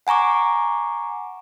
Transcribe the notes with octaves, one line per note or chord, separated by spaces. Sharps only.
F#5 G#5 A#5 C#6 D6